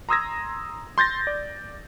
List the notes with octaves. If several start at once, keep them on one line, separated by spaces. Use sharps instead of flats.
A#5 C6 D#6 E6 G#6 A#6
C6 G6 A6 A#6
D5